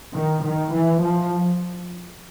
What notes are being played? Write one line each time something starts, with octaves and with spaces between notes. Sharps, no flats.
D#3
D#3
E3
F3